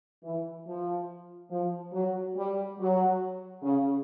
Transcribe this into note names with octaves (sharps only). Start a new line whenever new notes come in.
E3
F3
F3
F#3
G3
F#3
C#3